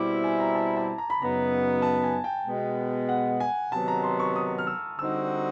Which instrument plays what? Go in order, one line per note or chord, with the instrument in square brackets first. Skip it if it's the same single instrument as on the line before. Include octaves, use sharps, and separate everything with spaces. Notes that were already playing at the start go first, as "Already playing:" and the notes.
Already playing: [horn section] B2 G3 C4 E4 [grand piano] D6
[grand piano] G#5
A#5
A5
A5
A#5
B5
[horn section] F#2 C#3 F#3 B3 D#4 [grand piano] A#5
[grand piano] A5
G#5
G5
[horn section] B2 G#3 B3
[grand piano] F#5
G#5
[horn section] C3 D#3 F#3 B3 [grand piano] A5
[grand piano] A#5
C6
C#6
D#6
F6
E6
[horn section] D3 G3 C4 D#4 F#4 [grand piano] E6